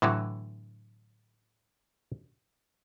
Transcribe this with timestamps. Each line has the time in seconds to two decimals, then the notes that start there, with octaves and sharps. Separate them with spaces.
0.02 A2 D3 E3 F#3